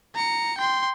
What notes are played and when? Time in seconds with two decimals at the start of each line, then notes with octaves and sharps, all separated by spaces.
0.14 A#5 C#7
0.58 G5 C6